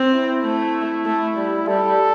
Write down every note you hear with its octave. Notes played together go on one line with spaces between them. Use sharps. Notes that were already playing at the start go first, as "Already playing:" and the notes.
Already playing: C4
E4
A3
A3
G3
G3 A4